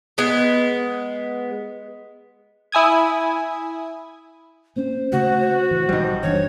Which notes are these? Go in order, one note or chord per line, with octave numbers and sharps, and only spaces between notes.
G#3 B3
E4 G#5 D#6 G#6
A#3 C4 C#4 C5
C#3 A3 F#4
A2 E3
B1 E3 F#3 G3 D#4
F#1 E3 D4 C5 C#5